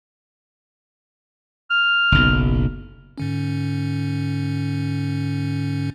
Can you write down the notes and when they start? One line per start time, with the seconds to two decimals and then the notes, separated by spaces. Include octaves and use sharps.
1.70 F6
2.12 F#1 B1
3.18 G#2 D3 C#4